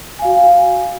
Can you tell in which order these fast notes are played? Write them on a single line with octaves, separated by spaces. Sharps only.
G#5 F5 F#4